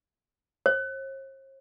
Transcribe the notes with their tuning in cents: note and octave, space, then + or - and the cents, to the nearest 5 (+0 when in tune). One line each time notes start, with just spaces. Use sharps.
C5 +45